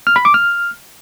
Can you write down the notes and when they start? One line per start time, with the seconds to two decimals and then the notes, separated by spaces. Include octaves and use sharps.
0.07 F6
0.16 B5
0.25 D6
0.34 F6